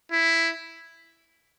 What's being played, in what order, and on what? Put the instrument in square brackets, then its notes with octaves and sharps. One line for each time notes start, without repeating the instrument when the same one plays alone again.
[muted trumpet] E4